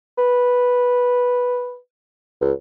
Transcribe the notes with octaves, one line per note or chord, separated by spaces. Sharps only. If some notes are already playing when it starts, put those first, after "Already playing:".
B4
C#2